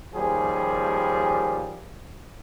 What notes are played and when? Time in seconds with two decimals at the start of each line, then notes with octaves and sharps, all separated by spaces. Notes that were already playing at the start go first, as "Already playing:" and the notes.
0.14 D#2 F3 G3 G#4